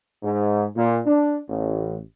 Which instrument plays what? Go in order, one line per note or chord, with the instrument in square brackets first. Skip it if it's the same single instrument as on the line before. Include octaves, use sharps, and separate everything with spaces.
[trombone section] G#2
A#2
D4
A1